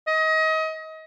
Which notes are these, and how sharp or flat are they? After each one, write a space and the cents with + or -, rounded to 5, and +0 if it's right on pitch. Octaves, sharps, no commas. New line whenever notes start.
D#5 +30